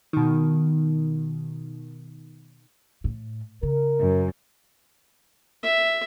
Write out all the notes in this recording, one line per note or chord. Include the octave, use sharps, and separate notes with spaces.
B2 D#3
A2
C#3 A#4
F#2
E5